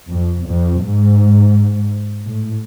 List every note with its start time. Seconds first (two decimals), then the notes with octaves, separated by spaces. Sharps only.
0.12 F2
0.48 F2
0.83 G#2
2.25 A2